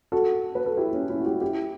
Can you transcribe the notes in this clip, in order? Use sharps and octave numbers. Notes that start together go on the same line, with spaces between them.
F#4 A4
B4
A4
E4 G4
C#4
C#4 E4
F#4
E4 G4
E4 G4